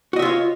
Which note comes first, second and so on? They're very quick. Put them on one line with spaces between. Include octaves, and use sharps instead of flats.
F#4 D#5 E5 F4 C#5